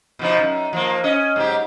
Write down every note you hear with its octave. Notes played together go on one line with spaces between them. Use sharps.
B2 F3 D#4
F#2
F3 A#3
C#4 D#5
G#2 F#3 G4